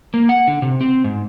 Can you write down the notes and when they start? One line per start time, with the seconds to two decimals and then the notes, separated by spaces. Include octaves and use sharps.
0.14 A#3
0.29 F#5
0.47 D3
0.62 C3
0.80 C4
1.04 G#2